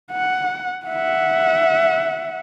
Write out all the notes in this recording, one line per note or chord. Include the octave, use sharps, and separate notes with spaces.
F#5
E5 F#5